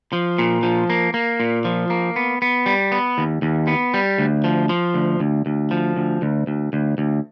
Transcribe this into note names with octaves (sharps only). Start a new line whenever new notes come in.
F3
A#2
F3
A#3
A#3
A#2
F3
A#3
B3
B3
G3
B3
D#2
D#2
B3
G3
D2
F3
F3
D2
D2
D2
F3
D2
D2
D2
D2
D2